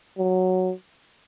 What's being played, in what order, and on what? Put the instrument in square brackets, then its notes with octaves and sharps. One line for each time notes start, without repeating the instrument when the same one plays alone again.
[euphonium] F#3